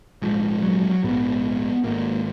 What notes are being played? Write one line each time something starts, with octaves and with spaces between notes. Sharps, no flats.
A#1 G#2 F3
F#3
A#1 G#2 B3
G#1 G#2 A#3